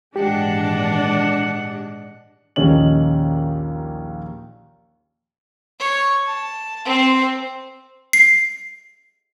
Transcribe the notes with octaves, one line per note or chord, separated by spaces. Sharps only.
G#1 A#2 E3 G#3 D4 G4 F#5
A#1 D#2 G3 C#4 D#5 F#7
C#5
A5
C4 C5
C7